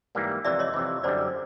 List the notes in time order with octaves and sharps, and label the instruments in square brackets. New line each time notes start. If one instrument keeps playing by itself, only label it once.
[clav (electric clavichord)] G#2 E3 G3 A#3
[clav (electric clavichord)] F2 C3 E3 [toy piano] D5 E5
[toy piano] C#5 D#5
[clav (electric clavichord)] F2 C3 E3
[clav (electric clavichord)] F#2 D3 G3 [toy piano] C5 D5